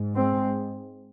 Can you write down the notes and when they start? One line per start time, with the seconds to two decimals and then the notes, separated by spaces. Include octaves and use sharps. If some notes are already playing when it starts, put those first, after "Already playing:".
Already playing: G#2
0.16 G#3 C4